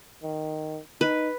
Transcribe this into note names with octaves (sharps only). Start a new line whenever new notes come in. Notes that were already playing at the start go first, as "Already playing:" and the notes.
D#3
D#4 B4